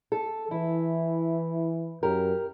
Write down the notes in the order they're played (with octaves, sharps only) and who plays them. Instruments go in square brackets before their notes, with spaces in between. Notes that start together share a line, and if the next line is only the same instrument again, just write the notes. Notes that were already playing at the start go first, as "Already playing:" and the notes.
[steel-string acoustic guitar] A4
[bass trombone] E3 [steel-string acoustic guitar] E4
[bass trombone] F#2 [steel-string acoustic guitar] G4 A#4